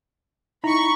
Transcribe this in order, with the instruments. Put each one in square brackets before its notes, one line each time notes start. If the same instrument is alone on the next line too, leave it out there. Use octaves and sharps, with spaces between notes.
[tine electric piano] D#4 E4 A#5 [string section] B5 C#6